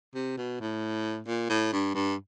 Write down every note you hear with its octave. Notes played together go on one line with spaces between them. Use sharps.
C3
B2
A2
A#2
A2
G2
G2